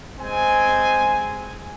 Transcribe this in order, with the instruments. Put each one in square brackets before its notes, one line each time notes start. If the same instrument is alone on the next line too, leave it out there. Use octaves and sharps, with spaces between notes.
[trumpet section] G#3 C4 G#5